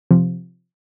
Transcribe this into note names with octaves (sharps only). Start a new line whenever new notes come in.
C3 F3